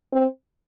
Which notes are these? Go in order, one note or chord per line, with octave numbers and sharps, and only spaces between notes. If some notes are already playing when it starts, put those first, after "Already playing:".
C4